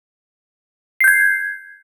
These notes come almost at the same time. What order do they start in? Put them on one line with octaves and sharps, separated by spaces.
C7 G6 G#6